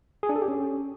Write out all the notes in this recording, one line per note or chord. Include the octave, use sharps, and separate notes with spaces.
G#4
D4
A4
G4
C#4